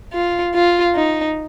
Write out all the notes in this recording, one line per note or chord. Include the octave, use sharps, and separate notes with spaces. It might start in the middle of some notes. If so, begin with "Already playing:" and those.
F4
F4
D#4